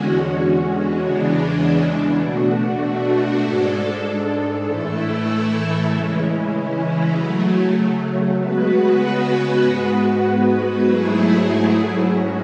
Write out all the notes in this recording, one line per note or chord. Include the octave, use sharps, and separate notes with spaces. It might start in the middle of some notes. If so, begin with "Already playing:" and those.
Already playing: E2 D3 G#3 C#4 F#4
E2 C#3 E3 G#3 D4
B2 A3 D4 F#4
G#2 G#3 D4 A4
A2 E3 A3 E4 A4
C#3 E3 G#3 C#4 E4
C#3 F#3 A3
C#3 G#3 B3 F#4 B4
G#2 G#3 B3 F#4 B4
G#2 F#3 A3 E4 G#4
G#2 F#3 C#4 F#4